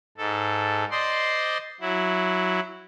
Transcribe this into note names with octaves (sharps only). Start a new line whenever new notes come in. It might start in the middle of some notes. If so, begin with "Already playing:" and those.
G#2 A4
C5 D5 D#5 C6
F#3 E4